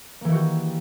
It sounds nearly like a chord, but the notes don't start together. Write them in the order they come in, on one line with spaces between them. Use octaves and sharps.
A#3 E3 D#3 F#4 G4